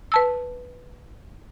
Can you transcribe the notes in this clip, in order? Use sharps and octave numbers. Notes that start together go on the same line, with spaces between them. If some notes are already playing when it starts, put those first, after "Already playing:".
B4 A5 E6